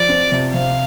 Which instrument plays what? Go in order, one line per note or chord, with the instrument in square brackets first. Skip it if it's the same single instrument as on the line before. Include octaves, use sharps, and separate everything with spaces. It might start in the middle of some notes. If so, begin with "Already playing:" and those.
Already playing: [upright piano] F3 [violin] D5
[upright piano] C4
C3
[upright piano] C3 [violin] F5